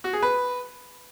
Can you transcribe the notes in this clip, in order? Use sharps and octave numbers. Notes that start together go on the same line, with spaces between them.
F#4
G#4
B4